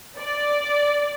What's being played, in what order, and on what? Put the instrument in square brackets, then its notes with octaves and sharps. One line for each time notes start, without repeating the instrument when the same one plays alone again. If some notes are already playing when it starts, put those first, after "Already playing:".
[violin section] D5